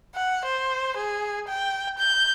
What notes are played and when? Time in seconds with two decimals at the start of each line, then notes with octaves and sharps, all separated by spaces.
0.15 F#5
0.45 C5
0.97 G#4
1.48 G5
1.98 G6